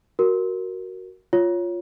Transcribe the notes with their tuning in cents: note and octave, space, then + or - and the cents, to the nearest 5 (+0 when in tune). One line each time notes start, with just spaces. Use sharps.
F#4 +10 A#4 +0
F4 +0 C#5 +0